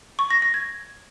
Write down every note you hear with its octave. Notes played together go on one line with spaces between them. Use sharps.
C#6
A#6
A#6
G#6